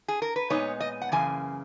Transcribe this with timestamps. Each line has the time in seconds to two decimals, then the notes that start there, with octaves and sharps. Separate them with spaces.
0.08 G#4
0.22 A#4
0.36 B4
0.50 A#2 G#3 B3 D#4 C#5
0.81 D#5
1.02 F#5
1.12 F#2 C#3 E3 A#3 G#5